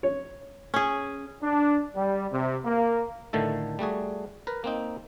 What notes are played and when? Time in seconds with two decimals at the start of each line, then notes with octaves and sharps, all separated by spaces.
0.03 C#5
0.74 C#4 G#4
1.43 D4
1.95 G3
2.31 C3
2.64 A#3
3.33 A2 D3 D#3 A3 A4
3.79 G3 A3 F#4 G#4
4.47 A#4 B4
4.64 A#3 C4 D#4